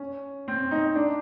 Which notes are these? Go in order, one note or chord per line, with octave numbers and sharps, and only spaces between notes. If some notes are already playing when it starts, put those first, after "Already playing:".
Already playing: C#4
C4
D#4
D4